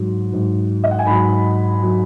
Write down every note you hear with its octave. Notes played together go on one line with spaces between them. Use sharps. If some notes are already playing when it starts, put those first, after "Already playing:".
Already playing: G#2 F#3
G#2 F#3
D#5
F#5
G#5
G#2 F#3 B5
F#3